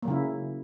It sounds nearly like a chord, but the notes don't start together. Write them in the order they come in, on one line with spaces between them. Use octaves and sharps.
A#3 F#3 C#3 E4